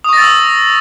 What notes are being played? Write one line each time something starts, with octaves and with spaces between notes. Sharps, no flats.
C#6 D#6 E6 A6 A#6